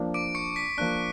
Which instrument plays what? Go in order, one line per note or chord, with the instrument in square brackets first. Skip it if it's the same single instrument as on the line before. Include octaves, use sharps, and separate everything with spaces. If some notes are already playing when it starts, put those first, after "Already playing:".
Already playing: [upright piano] F3 A#3 D4
[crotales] D6 D7
C#6 C#7
B6
[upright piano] F3 A#3 D4 [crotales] F#6